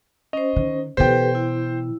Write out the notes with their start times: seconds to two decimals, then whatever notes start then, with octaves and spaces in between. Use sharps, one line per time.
0.33 C#4 C5 D#5
0.56 D#3
0.97 B2 E3 G4 A4 B4 C5 G5
1.35 E4